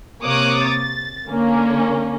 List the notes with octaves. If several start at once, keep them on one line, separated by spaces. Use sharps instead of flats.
C3 A#3 C#5 D6 D#6 F#6
A6
D3 A#3 C#4